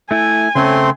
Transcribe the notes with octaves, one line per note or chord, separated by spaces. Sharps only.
A3 E4 G#5
C#3 A3 C4 C#4 A4 C6